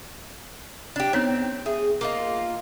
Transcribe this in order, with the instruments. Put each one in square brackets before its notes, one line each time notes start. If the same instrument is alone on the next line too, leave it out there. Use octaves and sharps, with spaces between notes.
[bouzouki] D4 G4
[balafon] B3 D#4 C#5 [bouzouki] C4
[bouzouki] G#4 [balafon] E5
[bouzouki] A#3 D#4 F4